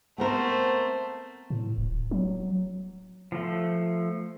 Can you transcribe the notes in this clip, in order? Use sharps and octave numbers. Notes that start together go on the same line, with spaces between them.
A3 B3 C4 A#4 C5
A2
D1
F#3
F3 A3